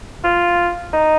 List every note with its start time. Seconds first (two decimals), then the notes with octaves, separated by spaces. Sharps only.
0.24 F4
0.93 D#4